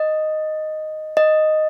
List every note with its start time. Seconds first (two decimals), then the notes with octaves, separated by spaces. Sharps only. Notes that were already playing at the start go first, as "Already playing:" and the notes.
Already playing: D#5
1.17 D#5